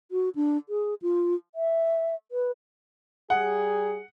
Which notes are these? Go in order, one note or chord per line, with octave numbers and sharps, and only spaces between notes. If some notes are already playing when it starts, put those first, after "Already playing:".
F#4
D4
G#4
F4
E5
B4
G3 G#4 F#5